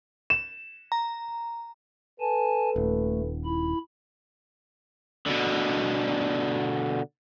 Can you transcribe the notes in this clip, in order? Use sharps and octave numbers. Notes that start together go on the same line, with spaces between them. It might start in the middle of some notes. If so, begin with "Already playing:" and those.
E7
A#5
A4 B4 G#5 A5
D#1 A3
E4 B5
B2 D3